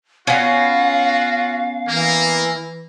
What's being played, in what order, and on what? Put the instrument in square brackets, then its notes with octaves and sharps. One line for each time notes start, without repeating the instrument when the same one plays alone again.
[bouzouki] B3 C#4 [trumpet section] F4 F#4 [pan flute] F5
[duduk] E3 [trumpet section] A#3